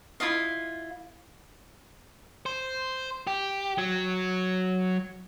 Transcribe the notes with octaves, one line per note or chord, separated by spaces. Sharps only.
E4 F4 D#5 F5
C5
G4
F#3